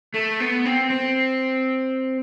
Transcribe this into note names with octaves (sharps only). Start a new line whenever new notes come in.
A3
B3
C4
C4